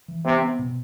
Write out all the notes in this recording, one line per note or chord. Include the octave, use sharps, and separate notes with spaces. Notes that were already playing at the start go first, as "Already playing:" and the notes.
E3
C3 B3
B3
B2